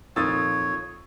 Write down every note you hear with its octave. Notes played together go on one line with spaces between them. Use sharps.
A#1 F2 D#3 F4 C#5 D#6 E6 A6